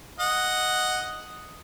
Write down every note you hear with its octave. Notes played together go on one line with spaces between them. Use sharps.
D#5 F#5